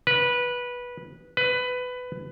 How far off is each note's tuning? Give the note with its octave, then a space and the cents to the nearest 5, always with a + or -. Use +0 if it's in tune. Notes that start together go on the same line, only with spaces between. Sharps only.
B4 -15
B4 +15